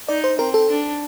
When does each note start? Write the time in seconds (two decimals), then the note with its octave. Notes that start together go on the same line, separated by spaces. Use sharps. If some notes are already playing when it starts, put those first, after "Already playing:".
0.08 D#4 D5
0.24 C5
0.39 C4 A#4
0.54 A4
0.70 D4